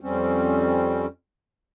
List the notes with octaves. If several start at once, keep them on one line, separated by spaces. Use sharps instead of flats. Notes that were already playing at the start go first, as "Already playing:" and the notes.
F2 G3 C4 C#4